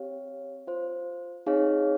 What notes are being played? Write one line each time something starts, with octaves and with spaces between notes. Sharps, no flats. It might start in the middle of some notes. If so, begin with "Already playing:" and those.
Already playing: C4 G4 C#5 F5
F4 C5 F5
C4 D#4 G#4 C#5 F5